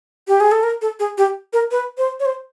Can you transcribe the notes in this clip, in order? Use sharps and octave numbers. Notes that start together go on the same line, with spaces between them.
G4
G#4
A4
A#4
A4
G#4
G4
A#4
B4
C5
C#5
C5